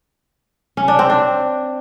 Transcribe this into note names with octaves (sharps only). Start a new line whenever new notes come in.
C#4
D4
C4
D4